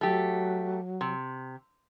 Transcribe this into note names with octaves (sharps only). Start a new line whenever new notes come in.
F#3 A3 G4
C3